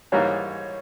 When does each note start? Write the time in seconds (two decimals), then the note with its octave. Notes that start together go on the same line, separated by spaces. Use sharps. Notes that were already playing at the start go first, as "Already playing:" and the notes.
0.12 G#2 E3 G3 A#3 D#4 C#5